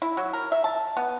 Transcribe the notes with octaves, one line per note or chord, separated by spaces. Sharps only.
E4
F#3
A#4
E5
A5
B3